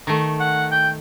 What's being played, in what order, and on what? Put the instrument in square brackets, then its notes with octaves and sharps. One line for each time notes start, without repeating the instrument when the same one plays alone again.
[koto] D#3 A3
[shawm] F#5
G5